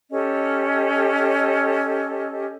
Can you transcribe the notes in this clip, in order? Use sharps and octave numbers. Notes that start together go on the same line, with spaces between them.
C#4 G4 A4 D#5